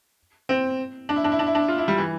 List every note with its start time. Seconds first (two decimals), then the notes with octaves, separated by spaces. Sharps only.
0.49 C4
1.09 D4
1.16 E4
1.24 D4
1.32 E4
1.39 D4
1.47 E4
1.55 D4
1.68 F4
1.78 E4
1.88 G3
1.98 E3